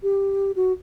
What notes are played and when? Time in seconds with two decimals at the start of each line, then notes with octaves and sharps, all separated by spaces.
0.03 G4
0.56 F#4